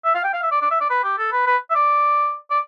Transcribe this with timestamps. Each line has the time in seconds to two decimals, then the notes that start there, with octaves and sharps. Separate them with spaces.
0.05 E5
0.15 F5
0.24 G5
0.33 F5
0.43 E5
0.52 D5
0.62 D5
0.71 E5
0.81 D5
0.90 B4
1.04 G4
1.18 A4
1.32 B4
1.47 B4
1.70 E5
1.75 D5
2.50 D5